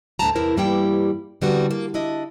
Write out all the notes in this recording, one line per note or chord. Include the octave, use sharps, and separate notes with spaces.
D2 A2 D3 G5 A5 A#5
E2 C3 E4 A#4 C5
G2 E3 G3 A#3 E4 G5
D3 E3 G3 B3 C4 F#4
A#3
D4 E4 D#5